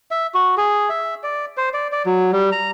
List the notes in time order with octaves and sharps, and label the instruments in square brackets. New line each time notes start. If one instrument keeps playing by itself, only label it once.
[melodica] E5
F#4
G#4
E5
D5
C5
D5
D5
F#3
G3
A#5